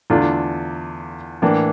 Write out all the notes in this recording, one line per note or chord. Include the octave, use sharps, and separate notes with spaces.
E2 D3 A3 D4 F4
A2 E3 A#3 D4